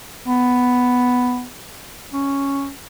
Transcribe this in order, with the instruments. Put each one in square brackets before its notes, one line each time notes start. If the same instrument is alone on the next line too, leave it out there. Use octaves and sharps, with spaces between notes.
[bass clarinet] B3
C#4